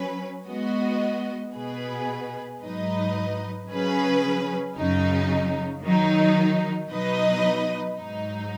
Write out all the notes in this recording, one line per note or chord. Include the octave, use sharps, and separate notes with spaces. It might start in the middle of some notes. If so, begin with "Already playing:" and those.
Already playing: F#3 C#4 B4
G#3 B3 F#4 D#5
B2 B3 G#4 B4
G#2 F#3 D#4 B4 D#5
C#3 F#3 C#4 G#4 B4
F#2 C#3 F#3 D#4
D#3 F#3 D#4
B2 F#3 D#4 B4 D#5
G#2 F#3 D#4